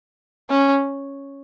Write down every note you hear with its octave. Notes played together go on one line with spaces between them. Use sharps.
C#4